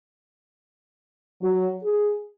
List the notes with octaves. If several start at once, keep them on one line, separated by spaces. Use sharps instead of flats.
F#3
G#4